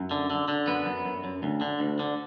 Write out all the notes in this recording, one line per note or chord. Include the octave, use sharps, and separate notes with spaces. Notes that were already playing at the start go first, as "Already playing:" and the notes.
Already playing: F#2
D3
D3
D3
F#2 B3
F#2
F#2
F#2
D2
D3
D2
D3